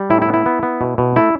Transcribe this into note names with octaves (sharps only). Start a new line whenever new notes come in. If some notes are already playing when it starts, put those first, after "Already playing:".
Already playing: G3
A2 E4
E4
B3
E4
B3
B3
B2
B2
A3 E4